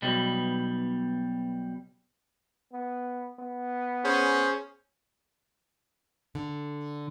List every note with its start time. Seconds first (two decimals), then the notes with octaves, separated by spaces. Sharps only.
0.02 B1 B2 G3
2.73 B3
3.39 B3
4.04 C#4 G#4 C5
6.35 D3